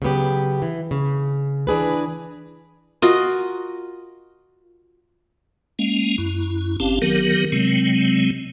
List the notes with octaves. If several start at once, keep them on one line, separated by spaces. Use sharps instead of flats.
C#3 F#3 B3 G4
E3
C#3
E3 D4 G#4 B4
F4 F#4 A#4 D#5
G#3 A#3 C#4
F#2 E4
G1 C4 C#4 G4 F5 A5
D#3 F#3 B3 G4 A#4
C3 F#3 G#3 C4